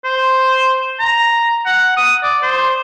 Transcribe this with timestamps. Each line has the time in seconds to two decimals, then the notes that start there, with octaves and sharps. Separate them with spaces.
0.04 C5
0.99 A#5
1.65 F#5
1.97 D#6
2.22 D5
2.42 C5